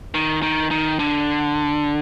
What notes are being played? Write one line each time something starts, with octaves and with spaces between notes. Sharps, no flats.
D#3
D#3
D#3
D3